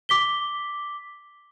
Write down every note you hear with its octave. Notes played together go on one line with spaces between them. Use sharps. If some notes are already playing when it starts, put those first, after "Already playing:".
D6 B6 G7